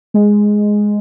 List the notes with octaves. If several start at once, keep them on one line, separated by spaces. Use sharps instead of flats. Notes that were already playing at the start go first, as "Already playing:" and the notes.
G#3